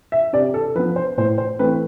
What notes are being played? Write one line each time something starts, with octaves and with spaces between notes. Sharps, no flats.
E5
C3 D5
A4
F3 B3 B4
C5
A2 C5
C5
E3 A3 C4 B4